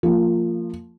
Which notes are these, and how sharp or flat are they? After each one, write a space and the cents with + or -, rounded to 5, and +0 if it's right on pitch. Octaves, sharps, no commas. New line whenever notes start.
F3 -5 A#3 -35